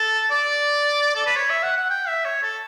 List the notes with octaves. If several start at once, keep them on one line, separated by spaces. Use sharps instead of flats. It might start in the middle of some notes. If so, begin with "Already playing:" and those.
Already playing: A4
D5
A4
B4
C#5
E5
F#5
F#5
G5
E5
C#5
A4